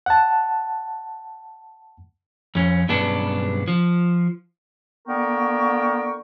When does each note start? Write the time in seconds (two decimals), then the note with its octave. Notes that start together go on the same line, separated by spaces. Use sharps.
0.06 F#5 A5
2.55 F2 C#4
2.89 B1 G2 C#3 B3 D4
3.68 F3
5.08 D3 A#3 B3 A#4 G5 C#6